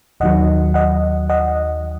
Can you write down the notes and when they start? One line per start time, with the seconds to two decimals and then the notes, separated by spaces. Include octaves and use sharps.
0.20 D#2 D#3 F#3 D#5 F#5
0.74 D#5 F#5
1.30 D#5 F#5